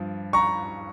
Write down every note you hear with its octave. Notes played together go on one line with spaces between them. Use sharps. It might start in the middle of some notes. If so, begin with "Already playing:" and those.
Already playing: G2 F3
A#5 C#6